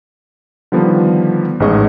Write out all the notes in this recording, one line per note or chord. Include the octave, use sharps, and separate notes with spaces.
D3 D#3 F3 G3 B3
A1 G#2 B3 G#4 D#5 C#6